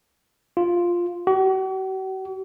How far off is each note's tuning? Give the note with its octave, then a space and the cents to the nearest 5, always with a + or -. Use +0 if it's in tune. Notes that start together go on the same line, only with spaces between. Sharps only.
F4 +0
F#4 +45